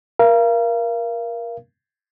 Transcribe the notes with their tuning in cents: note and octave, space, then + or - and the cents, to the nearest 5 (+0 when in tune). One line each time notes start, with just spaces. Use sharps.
A#4 +20 F5 -35